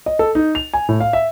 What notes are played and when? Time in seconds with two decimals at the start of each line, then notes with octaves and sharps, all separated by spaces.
0.06 D#5
0.19 A4
0.35 D#4
0.55 F7
0.73 G#5
0.89 A2
1.00 F5
1.13 E5